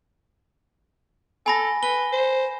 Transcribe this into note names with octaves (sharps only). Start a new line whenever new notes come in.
A4 G#5 B5 A#6
B4 G7
C5